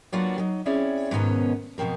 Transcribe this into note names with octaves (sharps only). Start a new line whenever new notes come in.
F#3 A#3 B3 D4 F4 F#4
F#3 D#4
C4 C#4 E4 G#4 C#5 D5
G#2 B2 D#3 B3 C#4 A#5
F2 B2 D#3 C4 A#4